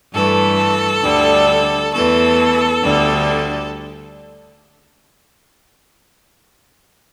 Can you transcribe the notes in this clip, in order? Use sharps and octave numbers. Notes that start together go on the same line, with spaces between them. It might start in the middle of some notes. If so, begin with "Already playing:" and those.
G2 E3 A3 A4
D2 D3 G3
E2 E3 A3 A4
D2 D3 G3